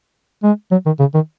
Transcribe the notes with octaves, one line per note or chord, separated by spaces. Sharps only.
G#3
F#3
D#3
C#3
D#3